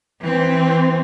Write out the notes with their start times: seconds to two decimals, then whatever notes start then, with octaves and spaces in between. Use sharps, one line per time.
0.20 E3 C4